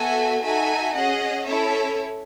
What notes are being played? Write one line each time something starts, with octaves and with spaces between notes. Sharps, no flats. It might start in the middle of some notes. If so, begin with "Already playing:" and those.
Already playing: B3 F#4 A4 E5 G#5
D#4 F#4 A4 E5 G#5
C#4 G#4 D#5 F#5
C#4 E4 A4 C#5 E5